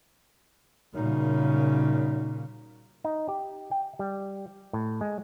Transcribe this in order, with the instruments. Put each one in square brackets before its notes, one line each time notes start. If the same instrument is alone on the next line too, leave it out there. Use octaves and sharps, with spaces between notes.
[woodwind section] F#2 G3 D#4 [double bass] A#2 C#3
[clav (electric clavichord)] D#4
G4
G5
G3
A2
G#3